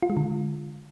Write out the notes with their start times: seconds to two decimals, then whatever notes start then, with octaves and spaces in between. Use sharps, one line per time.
0.03 F4
0.10 G#3
0.17 D3